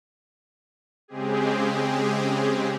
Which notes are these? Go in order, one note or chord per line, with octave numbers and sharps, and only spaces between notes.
C#3 G#3 C4 G4 G#4